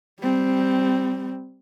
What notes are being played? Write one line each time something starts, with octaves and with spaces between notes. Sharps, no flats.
G3 C4